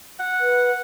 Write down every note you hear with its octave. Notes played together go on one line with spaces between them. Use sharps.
F#5
B4